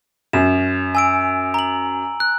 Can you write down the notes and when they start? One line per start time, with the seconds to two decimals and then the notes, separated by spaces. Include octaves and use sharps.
0.33 F#2 E7
0.95 G#5 E6 D7
1.54 A#5 F#7
2.20 F#6